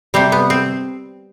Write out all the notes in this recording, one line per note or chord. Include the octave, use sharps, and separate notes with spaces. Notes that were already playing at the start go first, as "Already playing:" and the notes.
C3 G3 C4
B3
C4